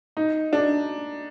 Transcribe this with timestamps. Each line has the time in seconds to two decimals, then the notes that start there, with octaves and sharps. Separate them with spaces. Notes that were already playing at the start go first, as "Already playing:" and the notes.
0.17 D#4
0.53 D4